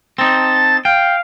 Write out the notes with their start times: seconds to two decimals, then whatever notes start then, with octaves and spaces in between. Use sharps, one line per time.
0.18 C4 D#4 A5 A6
0.85 F5 G5